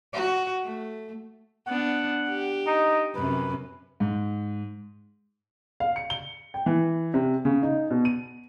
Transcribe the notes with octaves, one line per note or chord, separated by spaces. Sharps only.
F#4
A3
B3 D4 F#5
G4
D#4
F#2 C3 B4
G#2
F5
C#7
G7
G5
E3
C3
C#3
D#4
B2
D#7